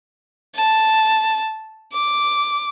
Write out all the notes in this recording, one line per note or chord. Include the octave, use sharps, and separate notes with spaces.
A5
D6